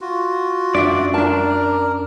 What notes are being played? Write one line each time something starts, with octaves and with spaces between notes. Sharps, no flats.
F4 F#4
F#2 D4 D5 E5
D4 A#4 A5